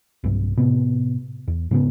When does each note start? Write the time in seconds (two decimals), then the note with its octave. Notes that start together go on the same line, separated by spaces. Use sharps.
0.24 B1 G2
0.58 A2 C3 B3
1.48 E2
1.71 G#2 C#3 B3